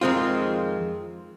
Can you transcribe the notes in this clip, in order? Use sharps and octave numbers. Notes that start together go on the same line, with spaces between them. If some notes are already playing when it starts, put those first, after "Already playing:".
F2 D#3 G#3 C4 F4